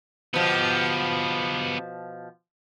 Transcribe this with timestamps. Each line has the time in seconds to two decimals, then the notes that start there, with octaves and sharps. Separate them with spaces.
0.34 B2 F3 B3 G4